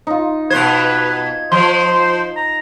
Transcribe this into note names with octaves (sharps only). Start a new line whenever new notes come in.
D#4 F4
B2 B4 C5 G#6
F3 C5 C6
A#5